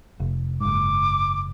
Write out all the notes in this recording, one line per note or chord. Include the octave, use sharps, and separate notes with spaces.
F1
F#1 G#2 D6